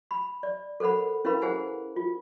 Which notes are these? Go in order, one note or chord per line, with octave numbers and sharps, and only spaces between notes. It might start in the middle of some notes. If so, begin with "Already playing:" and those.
B5
D5
A4 A#4 C5 F#5 B5
C#4 E4 A#4 B4 F5 B5
G#4 C5 F#5 G#5
F4